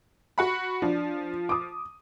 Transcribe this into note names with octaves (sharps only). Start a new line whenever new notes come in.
F#4 F#5 B5
F3 D4
D6 D#6